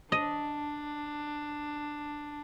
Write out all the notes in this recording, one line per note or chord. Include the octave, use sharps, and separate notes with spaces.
D4 D#5